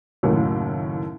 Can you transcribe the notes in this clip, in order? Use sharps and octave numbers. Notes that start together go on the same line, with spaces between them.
F#1 D#2 A2 F#3